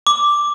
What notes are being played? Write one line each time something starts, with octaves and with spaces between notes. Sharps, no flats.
D6